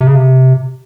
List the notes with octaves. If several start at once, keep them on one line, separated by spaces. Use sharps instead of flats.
C3
C#3
C3